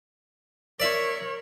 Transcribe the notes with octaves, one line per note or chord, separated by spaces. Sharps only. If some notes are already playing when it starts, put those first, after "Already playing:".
A#4 C#5 D5 E5